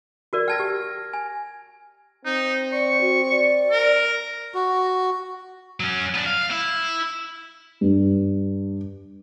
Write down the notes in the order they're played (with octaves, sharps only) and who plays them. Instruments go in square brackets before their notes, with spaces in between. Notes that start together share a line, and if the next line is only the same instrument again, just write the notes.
[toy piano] F#4 A#4 D5
[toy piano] G5 A5 [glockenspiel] F6 G#6 A#6
[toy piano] G4
[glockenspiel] G#5
[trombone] C4 [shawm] D#4
[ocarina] D5 [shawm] C#6
[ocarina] F#4
D5
[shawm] A#4
[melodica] F#4
[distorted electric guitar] F#3 C#4
B3 D4
F5
E4
[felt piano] G2